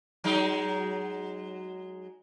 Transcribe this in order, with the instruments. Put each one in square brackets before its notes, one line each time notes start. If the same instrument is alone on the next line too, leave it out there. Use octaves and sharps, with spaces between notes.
[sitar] F#3 G#3 D#4